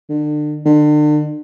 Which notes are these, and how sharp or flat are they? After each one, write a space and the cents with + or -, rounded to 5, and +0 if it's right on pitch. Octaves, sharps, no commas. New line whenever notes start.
D3 +35
D3 +35